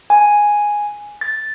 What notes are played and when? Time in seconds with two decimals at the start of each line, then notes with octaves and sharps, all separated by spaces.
0.10 G#5
1.21 A6